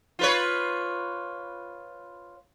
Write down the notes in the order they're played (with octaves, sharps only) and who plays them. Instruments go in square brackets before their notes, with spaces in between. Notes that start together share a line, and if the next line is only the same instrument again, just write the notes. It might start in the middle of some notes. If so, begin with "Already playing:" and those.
[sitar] F4 B4 C#5